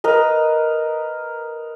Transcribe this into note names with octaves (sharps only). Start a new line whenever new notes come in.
A#4 B4 D#5